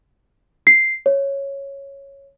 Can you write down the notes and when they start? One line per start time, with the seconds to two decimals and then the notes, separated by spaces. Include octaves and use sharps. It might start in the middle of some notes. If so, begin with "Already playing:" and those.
0.67 C7
1.06 C#5